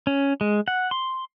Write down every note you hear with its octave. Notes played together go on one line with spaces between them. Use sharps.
C#4
G#3
F#5
C6